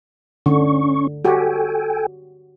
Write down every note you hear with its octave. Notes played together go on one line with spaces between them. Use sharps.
D3 C#4 C#6
F#4 G4 A4 G5 G#5